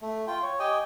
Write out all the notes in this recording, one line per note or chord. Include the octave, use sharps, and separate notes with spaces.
A3
F4 G5
C#5
G4 D#5 G5 G#5